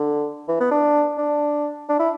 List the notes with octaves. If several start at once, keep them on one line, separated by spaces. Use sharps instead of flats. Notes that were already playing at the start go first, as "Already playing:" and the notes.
Already playing: D3
E3
B3
D4
D4
D4
E4